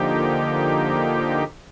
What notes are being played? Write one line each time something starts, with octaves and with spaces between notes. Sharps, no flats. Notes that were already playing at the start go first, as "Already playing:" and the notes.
Already playing: D3 F3 A#3 D#4 G4